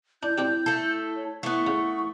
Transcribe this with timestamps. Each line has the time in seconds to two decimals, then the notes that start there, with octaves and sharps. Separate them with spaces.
0.23 D4 E4 G6
0.38 C4 D4 E4 G4
0.66 A3 A4
1.16 C#5
1.43 A3 B3 E4 C#6
1.67 C#3